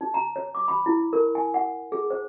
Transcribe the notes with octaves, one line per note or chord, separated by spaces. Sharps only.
D#4
A#5
C#5
D6
B5
E4
A#4
G#5
F#5
G#4
C5